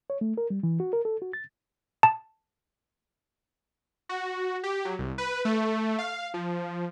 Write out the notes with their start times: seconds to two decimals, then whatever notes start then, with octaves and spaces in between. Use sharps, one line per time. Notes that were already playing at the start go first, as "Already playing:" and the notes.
0.10 C#5
0.21 A3
0.38 A#4
0.50 G3
0.63 E3
0.80 F#4
0.93 A#4
1.05 A4
1.22 F#4
1.33 A6
2.03 A5
4.09 F#4
4.63 G4
4.85 F#3
4.99 C2
5.18 B4
5.45 A3
5.98 F5
6.34 F3